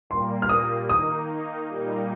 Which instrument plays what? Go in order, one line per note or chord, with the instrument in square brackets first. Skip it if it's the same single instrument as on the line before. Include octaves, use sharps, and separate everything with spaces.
[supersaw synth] A#2 G3 A#3 [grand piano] C6
[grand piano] F6
D#6
[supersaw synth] D#3 A#3 D#4 [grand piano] D#6
[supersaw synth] A#2 G3 A#3 D#4